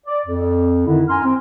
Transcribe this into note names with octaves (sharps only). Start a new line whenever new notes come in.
D5
F2
D3 D#3 D#4 E4
F#2 G#5 A#5 C6 F6
C4